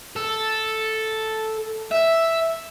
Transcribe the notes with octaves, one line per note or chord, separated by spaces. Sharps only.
A4
E5